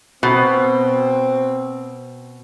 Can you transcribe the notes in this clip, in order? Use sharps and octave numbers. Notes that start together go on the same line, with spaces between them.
B2 C4